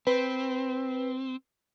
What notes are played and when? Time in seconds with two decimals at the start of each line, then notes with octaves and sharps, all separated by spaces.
0.07 C4 B4